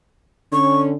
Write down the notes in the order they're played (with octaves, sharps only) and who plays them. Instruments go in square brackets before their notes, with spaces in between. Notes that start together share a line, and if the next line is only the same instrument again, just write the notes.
[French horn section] D3 C#4 [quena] C#6